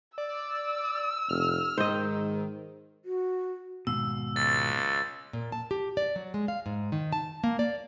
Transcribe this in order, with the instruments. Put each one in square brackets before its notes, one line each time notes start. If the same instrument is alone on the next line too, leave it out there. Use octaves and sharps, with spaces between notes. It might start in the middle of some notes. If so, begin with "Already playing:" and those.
[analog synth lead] D5 [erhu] E6
[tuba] F1 [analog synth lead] F6
[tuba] G#2 [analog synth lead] D#3 [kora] C5 D#5
[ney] F#4
[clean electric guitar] D#2 G#2 B2 [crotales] E6
[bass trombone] C#2 [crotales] A6
[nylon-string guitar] A#2
A5
G4
D5
F#3
G#3
F5
G#2
D#3
A5
A#3
D5